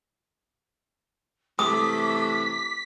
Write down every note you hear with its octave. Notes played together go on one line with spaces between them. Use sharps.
C3 E3 A3 D6 D#6 B6